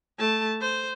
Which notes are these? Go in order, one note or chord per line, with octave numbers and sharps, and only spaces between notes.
A3 A5
C5